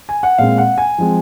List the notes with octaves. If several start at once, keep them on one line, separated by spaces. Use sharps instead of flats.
G#5
F#5
A#2 G#3 C4 F5
F#5
G#5
F3 G#3 C4